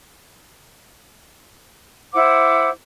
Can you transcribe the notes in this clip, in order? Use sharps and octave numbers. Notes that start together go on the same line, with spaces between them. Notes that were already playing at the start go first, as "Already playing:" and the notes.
E4 C5 F#5 D6